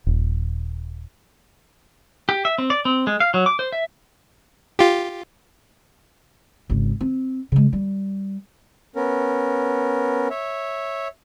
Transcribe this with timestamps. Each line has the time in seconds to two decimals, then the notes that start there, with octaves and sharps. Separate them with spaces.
0.07 D#1
2.29 G4
2.45 E5
2.58 C4
2.70 D5
2.85 C4
3.07 G#3
3.20 F5
3.34 F#3
3.46 D6
3.59 C5
3.72 E5
4.79 F4 G4
6.70 G#1 C#3
7.01 C4
7.52 C#3 G#3
7.73 G3
8.96 B3 C#4 A#4
10.30 C#5 E5